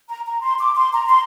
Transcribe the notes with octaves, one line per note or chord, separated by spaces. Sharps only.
A#5
A#5
C6
D6
C6
A#5
C6